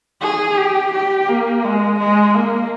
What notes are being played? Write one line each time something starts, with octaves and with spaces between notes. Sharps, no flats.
G#4
G4
G4
A#3
G#3
G#3
A#3